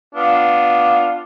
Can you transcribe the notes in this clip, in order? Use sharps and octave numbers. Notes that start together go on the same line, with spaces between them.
B3 D4 F4